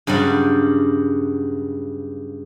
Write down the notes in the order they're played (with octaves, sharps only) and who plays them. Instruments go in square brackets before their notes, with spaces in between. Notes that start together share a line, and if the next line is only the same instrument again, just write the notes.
[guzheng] G2 C#3 F#3 G3